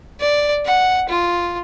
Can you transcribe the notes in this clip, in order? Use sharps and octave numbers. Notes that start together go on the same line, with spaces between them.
D5
F#5
F4